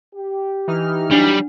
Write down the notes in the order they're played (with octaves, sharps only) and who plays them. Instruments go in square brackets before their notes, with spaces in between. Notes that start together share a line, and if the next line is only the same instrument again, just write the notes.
[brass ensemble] G4
[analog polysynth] E3 D#4 F6
[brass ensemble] F#3 [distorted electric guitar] G3 [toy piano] D4 F#5